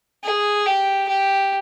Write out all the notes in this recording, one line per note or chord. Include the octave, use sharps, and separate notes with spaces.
G#4
G4
G4